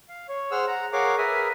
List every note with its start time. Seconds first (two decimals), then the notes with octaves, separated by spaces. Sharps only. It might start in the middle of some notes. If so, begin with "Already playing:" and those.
0.09 F5
0.29 C#5
0.51 G#4 C5 F#5 E6 F6
0.67 F#5 A#5
0.93 G#4 A#4 C#5 F5 F#5 D6
1.18 G#4 A#4 B4 E5 D#6